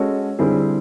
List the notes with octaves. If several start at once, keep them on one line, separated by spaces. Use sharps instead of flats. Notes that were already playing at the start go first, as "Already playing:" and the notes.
Already playing: G#3 C#4 F#4 A4 C#5
D3 G3 C4 E4 G#4